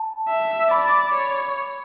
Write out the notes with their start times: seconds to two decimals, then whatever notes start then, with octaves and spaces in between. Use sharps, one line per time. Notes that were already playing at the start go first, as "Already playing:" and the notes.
Already playing: A5
0.29 E5
0.71 D5 B5
1.14 C#5